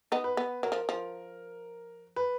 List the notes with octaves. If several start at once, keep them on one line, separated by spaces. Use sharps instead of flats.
B3 D#4
B4
B3
F#3 A#4
F3
F3
B4